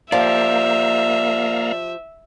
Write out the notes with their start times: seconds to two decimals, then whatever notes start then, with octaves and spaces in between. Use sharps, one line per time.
0.12 F3 A#3 G4 D5 E5 F5 A#5